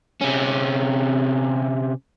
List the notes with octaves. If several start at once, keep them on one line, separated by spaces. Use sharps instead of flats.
C3 C#4